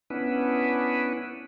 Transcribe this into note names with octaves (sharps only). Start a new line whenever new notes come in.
B3 C#4 D4 E4 B4